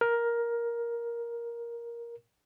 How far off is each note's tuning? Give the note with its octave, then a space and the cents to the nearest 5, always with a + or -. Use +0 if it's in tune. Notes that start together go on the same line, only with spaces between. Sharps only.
A#4 +10